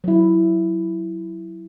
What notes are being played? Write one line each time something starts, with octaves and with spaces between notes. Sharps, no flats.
F#3 E4